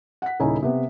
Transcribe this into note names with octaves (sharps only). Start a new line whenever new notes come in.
F#5 B6
D#1 C#3 D#4 E4 C#5 G#5
C3 B3